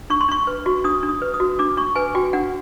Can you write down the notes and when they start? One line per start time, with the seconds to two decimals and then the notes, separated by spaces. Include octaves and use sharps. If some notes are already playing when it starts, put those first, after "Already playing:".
0.10 D4 C#6
0.21 C6
0.28 D4 C#6
0.47 B4
0.66 F#4
0.84 D4 D#6
1.03 D4
1.09 D#6
1.22 B4
1.34 D#6
1.40 F#4
1.59 D4 D6
1.77 D4 C#6
1.95 B4 G#5
2.15 F#4 G5
2.33 D4 F#5